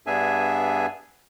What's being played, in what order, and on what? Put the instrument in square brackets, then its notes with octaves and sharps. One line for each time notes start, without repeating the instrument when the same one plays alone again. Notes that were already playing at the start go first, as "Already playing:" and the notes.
[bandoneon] G2 B3 D4 G#4 E5 G#5